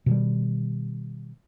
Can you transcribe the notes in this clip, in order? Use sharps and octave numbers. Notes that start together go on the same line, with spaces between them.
B2 D#3 G3